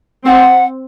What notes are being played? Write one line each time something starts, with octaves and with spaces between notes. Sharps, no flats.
C4 F#5